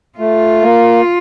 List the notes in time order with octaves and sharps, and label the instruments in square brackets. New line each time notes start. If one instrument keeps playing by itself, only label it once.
[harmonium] A3 [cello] F4
[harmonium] A#3